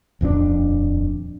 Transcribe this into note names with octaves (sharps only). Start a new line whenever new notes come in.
D#1 F2 E3 D4